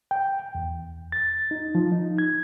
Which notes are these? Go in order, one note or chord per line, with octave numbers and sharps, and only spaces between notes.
G5
E2
A6
D#4
F3
D#4
G#6